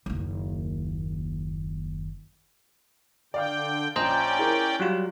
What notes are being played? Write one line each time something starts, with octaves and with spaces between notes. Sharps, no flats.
F#1 D#2
D3 D5 F5 G5 D6
A#1 C#4 C5 D5 D#5 G5 A#5
E4 G#4 A#4
F#3 G3 F4 F#4